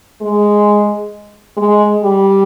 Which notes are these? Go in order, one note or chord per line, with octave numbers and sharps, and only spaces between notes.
G#3
G#3
G3